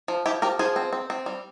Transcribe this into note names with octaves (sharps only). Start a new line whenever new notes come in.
F3
F3 E4 G4
F3 G4 A#4
F3 G#4 C5
C4
C4
C4
G3